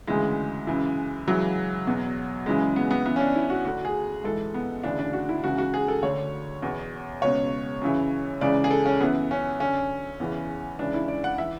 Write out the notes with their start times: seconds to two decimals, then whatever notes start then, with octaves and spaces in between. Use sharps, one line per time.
0.07 D2 C#3 E3 G#3
0.67 F#2 C#3 E3
1.27 C#2 C#3 E3 F#3
1.87 E2 B2
2.46 F#2 C#3 E3 G#3
2.76 B3
2.91 B3
3.05 F#2 E3 B3
3.16 C#4
3.20 D4
3.35 E4
3.50 F#4
3.65 D2 D3 F#4
3.85 G#4
4.24 G#2 E3 A4
4.54 B3
4.84 D2 C#3 E3 D4
4.99 D4
5.13 F#4
5.29 E4
5.44 C#2 C#3 E3 F#4
5.58 F#4
5.74 G#4
5.88 A4
6.02 D2 D3 C#5
6.62 E2 B2
7.22 C#2 B2 C#5
7.81 F#2 C#3 E3
8.41 C#2 C#3 E3 D5
8.64 G#4
8.71 A4
8.86 C#4
9.00 F#2 E3 B3
9.31 C#4
9.60 F#2 D3 C#4
10.20 E2 C#3 E3
10.79 C#2 C#3 E3 D4
10.94 E4
11.08 D5
11.24 F#5
11.38 E3 E5